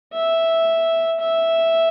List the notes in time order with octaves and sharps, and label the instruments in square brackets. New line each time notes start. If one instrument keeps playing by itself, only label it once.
[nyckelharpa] E5
E5